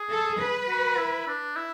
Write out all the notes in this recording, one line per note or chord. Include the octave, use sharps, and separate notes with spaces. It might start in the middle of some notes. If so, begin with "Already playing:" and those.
Already playing: G#4
A4
B4
F#4
E4
D4
E4